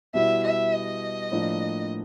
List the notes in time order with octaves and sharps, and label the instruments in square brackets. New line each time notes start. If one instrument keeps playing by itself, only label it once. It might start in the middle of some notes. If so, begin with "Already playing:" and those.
[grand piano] B2 G3 B3 E4 [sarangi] E5
[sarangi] E5
D#5
[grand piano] A2 F3 A#3 D4